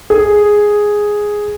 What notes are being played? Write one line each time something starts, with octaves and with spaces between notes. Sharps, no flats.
G#4